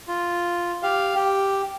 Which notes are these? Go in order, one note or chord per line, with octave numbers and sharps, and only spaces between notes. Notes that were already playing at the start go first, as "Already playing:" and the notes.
F4
G4 F5
G4